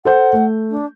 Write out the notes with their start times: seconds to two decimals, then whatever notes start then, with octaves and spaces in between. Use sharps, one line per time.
0.05 A4 C5 F#5 G6
0.33 A3
0.70 D4